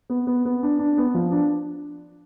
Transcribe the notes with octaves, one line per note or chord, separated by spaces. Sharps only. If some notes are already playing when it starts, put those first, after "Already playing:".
B3
B3
B3
D4
D4
B3
F3
D4